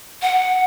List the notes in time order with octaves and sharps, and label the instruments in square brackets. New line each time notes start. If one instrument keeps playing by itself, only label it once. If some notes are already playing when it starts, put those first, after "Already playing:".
[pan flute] F#5